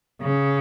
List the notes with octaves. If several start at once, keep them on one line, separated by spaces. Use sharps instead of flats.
C#3